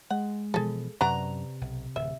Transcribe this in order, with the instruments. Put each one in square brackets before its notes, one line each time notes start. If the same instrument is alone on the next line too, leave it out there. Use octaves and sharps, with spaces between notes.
[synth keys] G#3 [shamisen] F#5
[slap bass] B2 E3 F3 [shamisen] G#4 A4
[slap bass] F#2 [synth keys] C3 [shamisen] B4 D5 F#5 [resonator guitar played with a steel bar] A#5
[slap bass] B1
[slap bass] D1 [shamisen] E5